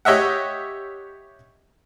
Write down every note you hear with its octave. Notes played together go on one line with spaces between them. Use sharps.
G4 C#5 D#5 E5 F#5